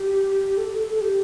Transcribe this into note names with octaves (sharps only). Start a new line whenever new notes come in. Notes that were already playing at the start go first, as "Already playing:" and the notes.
Already playing: G4
A4
A4
A4
G4